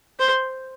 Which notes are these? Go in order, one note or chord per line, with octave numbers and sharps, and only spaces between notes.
C5